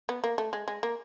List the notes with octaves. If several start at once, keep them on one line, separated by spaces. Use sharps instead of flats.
B3
A#3
A3
G#3
G#3
A#3